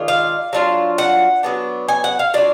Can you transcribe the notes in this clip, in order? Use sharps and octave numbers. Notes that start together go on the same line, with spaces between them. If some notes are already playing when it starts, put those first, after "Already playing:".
Already playing: D#3 G#3 D4 F4
F5
F#3 D4 F4
F#5
F#3 B3 D4
G#5
F#5
F5
F#3 D4 F4 D5